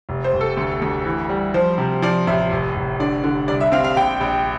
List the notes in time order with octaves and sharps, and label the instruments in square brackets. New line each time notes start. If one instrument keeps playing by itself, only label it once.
[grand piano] F1
C5
F1
A4
D2
D2
E3
G3
F3 C5
C3
F3 D5
A1 E5
F1
F1
D3 D5
D3
C2 D5
E5
C4 F5
F5
A#1 G5
A#1